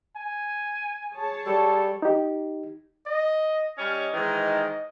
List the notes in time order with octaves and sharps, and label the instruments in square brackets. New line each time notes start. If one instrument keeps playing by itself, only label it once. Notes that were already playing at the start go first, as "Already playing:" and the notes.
[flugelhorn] G#5
[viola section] G#4 C#5 A5
[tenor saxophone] G3 [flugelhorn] A4
[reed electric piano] D#4 G4
[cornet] D#5
[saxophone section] G3 C#4 [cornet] D#5
[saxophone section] G#2 D#3 E3